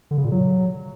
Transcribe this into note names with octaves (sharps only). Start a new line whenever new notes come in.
D3
C#3
A#2
F#3